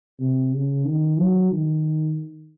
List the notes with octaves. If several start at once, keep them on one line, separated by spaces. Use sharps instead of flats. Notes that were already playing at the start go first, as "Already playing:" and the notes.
C3
C#3
D#3
F#3
D#3